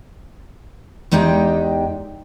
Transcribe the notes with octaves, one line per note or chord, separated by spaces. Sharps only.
E2 G#3 D#4 G4 G5